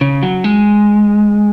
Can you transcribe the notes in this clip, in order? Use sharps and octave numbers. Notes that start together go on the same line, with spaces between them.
C#3
F#3
G#3